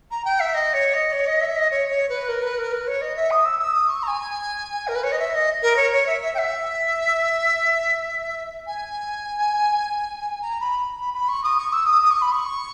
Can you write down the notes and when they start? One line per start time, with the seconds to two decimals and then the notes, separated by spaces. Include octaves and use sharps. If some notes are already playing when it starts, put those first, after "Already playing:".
0.11 A#5
0.25 G5
0.40 E5
0.54 D#5
0.74 C#5
0.94 D#5
1.13 C#5
1.27 D#5
1.41 E5
1.57 D#5
1.71 C#5
1.90 C#5
2.09 B4
2.29 A#4
2.43 B4
2.58 A#4
2.72 B4
2.87 C#5
3.01 D#5
3.16 E5
3.31 D#6
3.45 E6
3.59 E6
3.73 D#6
3.88 C#6
4.03 A#5
4.08 G#5
4.88 A#4
4.95 B4
5.04 C#5
5.12 D#5
5.19 E5
5.34 D#5
5.63 A#4
5.76 C#5
5.92 C#5
6.06 E5
6.21 E5
6.35 G5
6.38 E5
8.67 G#5
10.42 A#5
10.61 B5
11.00 B5
11.14 B5
11.29 C#6
11.44 D#6
11.58 C#6
11.73 E6
11.86 D#6
12.02 D#6
12.11 C#6
12.22 B5
12.32 C#6